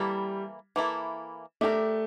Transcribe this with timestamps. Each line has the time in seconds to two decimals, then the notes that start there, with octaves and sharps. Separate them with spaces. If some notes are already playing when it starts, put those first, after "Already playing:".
Already playing: E3 G3 A#3 E4 A4
0.76 E3 A#3 E4 A4
1.61 A3 D4 G4 A#4